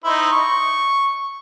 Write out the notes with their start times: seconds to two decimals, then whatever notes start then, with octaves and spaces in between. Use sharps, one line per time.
0.04 D#4 E4 C5
0.31 C#6